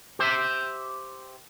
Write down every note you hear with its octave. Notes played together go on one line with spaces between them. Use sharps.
G4 C5 E5